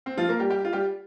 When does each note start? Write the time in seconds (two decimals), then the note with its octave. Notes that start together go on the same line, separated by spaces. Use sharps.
0.06 C4
0.17 F3 F4
0.28 A#3 A#4
0.39 G3 G4
0.50 G3 G4
0.65 F4
0.73 G3 G4